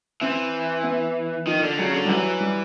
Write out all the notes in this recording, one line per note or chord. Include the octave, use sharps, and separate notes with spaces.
E3 C4
B3
D#3 F3
D3
C#3 F#3
D3
G3
E3 F#3
G3